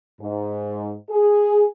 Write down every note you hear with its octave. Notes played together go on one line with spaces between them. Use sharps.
G#2
G#4